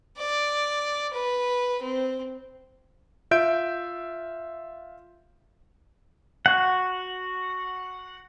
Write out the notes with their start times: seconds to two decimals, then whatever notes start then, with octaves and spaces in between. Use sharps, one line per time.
0.18 D5
1.14 B4
1.82 C4
3.31 F4 E5 G6 D7
6.46 F#4 F#5